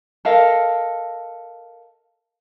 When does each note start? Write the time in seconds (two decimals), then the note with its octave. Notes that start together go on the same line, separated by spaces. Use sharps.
0.25 A4 A#4 D#5 F5